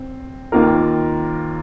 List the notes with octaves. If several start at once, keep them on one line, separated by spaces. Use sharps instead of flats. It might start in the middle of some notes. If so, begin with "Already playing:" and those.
Already playing: C4
D#2 D#3 A#3 F4 A#4